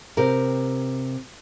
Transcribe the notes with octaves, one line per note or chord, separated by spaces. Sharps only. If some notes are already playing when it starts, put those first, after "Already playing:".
C3 G4 A#4